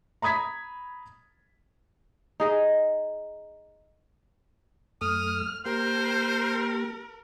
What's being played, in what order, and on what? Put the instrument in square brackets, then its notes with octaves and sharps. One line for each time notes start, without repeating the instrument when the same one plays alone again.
[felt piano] A#5 B5 D#6 G#6 B6
[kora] D#4 G#4 D#5
[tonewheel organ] F#2 A3 [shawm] D#6 [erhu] F6
[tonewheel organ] A#3 G4 [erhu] A#4 [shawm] C5